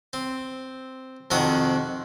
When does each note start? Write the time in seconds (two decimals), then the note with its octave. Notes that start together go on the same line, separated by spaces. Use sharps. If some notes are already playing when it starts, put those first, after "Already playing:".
0.13 C4
1.31 F2 C3 D#3 F#4 D#6